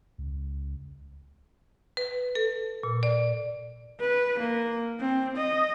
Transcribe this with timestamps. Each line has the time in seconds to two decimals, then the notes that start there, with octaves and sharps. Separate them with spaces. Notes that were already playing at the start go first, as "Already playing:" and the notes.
0.18 C#2
1.97 B4
2.35 A4
2.83 A#2
3.03 D5
4.00 B4
4.39 A#3
4.99 C4
5.37 D#5